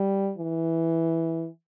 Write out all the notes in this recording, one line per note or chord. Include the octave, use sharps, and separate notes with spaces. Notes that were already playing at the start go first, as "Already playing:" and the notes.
Already playing: G3
E3